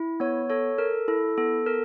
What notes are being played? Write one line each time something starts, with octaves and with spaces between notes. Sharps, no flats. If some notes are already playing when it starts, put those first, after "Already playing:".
Already playing: E4
B3 C#5
A4 C#5
A4 A#4
E4 A4
B3 A4
A4 A#4